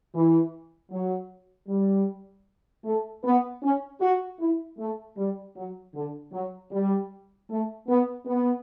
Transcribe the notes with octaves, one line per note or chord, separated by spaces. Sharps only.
E3
F#3
G3
A3
B3
C#4
F#4
E4
A3
G3
F#3
D3
F#3
G3
A3
B3
B3